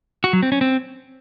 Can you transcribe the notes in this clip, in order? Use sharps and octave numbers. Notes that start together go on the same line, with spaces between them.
F#4
F#3
C4
C#4
C4